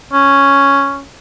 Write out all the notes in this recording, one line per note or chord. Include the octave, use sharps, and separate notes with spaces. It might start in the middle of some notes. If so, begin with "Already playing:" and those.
C#4